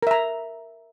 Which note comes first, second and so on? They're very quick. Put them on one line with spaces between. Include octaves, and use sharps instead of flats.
A#4 E5 A#5